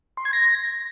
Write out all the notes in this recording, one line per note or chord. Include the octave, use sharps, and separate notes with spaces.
C6
G#6
A#6